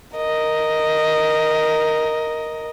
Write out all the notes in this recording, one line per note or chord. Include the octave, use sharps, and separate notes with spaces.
A#4 D#5